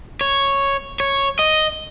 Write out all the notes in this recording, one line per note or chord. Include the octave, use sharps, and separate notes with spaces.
C#5
C#5
D#5